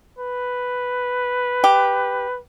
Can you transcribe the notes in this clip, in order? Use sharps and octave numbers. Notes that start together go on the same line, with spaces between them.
B4
G4